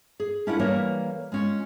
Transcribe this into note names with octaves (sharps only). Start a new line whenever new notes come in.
G#4
C#4 D4 E4 F4 A#4 F#5
E3 G3 A#3 A#4 C#5
G#3 C#4 F4